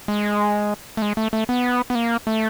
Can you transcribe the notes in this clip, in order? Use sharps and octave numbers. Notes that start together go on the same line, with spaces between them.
G#3
A3
G#3
A3
A3
B3
B3
A#3
A3